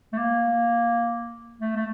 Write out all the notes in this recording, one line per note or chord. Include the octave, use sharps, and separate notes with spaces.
A3
A#3
A3
A3